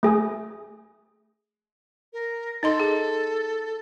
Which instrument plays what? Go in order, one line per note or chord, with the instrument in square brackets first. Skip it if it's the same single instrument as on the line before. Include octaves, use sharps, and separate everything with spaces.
[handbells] A3 G#4 G#5 D#6
[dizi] A#4
[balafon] D#4 D#5 C6 [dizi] A4
[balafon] G#4